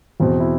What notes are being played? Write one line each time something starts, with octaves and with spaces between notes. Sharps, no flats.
E2 B2 C4
E4